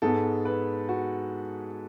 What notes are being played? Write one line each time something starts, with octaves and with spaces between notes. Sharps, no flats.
G#2 G#3 B3 A4
B4
F#4